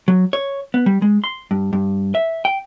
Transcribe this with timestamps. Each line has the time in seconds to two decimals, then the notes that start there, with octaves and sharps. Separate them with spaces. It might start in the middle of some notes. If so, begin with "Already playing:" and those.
0.08 F#3
0.33 C#5
0.74 B3
0.86 G3
1.02 G#3
1.24 C6
1.51 G2
1.73 G2
2.15 E5
2.45 G5